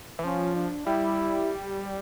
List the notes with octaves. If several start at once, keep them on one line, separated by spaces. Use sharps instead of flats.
E3
F3 C#4
D4
G3 E4